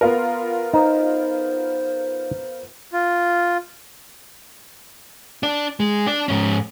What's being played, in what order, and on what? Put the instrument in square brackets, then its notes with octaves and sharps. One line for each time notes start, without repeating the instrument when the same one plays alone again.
[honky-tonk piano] B3 F4 A#4
[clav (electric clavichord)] D#4 [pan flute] C5
[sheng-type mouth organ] F4
[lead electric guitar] D4 D5
G#3
D4 D5
G#2 C#4